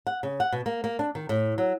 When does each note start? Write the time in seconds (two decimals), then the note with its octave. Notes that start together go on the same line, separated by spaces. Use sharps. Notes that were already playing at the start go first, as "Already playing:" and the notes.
0.07 F#5
0.23 C#3
0.40 F#5
0.52 B2
0.66 A#3
0.84 A#3
0.99 D4
1.15 D#3
1.29 A2
1.58 F#3